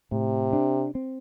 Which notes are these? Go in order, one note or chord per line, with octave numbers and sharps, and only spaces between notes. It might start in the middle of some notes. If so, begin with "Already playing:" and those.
A2 C3
D4
C4